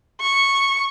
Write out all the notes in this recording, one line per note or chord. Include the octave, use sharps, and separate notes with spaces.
C#6